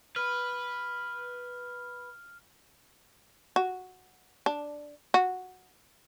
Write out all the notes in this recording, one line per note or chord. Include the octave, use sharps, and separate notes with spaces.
B4 F6
F#4
D4
F#4